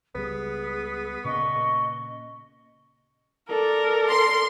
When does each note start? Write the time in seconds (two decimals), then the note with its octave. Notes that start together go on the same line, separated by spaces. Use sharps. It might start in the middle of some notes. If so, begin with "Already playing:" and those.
0.15 C#2 G3 B3 G#4
1.25 A#2 C#3 D#5 C#6
3.49 A4 A#4 D5
4.09 C6